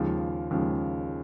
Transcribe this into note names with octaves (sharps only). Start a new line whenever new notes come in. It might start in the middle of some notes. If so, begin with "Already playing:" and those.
Already playing: D#2 C#3 F3 G#3
D#2 C#3 F3 G#3